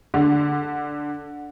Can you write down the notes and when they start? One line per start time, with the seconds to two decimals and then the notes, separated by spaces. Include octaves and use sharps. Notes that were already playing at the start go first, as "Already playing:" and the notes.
0.14 D3